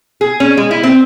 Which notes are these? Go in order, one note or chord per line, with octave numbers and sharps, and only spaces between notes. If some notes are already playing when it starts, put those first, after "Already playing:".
G#4
C#4
G#3
E4
C4